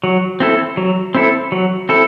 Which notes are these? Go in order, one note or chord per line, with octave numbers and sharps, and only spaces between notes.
F#3
C4 E4 A4
F#3
C4 E4 A4
F#3
C4 E4 A4